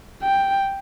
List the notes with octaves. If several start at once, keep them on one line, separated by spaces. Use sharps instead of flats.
G5